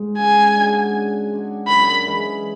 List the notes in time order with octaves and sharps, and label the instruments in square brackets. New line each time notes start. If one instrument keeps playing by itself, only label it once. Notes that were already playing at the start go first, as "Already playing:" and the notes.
Already playing: [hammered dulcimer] G#2 G#3
[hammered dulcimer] C#3 [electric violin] G#5
[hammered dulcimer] G#3 D4 F#4
C#3
G#3 D4 F#4
[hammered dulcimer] F#2 [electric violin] B5
[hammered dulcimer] E3 G#3 C#4